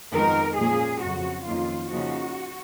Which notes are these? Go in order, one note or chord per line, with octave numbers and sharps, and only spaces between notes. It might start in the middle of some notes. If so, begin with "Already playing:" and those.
F2 D#3 G#3 B3 D#4 A#4
A#2 F3 A#3 C#4 G#4
F2 C#3 F#3 F#4
F2 D#3 A#3 C#4 F4
C#3 F3 A#3 D#4 F#4